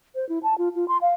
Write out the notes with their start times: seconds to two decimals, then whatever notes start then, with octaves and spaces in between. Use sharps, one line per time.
0.15 C5
0.29 E4
0.43 A5
0.58 F4
0.75 F4
0.88 C6
1.01 F5